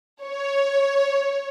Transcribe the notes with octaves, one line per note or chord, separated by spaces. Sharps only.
C#5